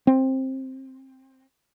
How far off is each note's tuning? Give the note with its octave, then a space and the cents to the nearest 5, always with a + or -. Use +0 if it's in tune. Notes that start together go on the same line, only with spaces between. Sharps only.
C4 +15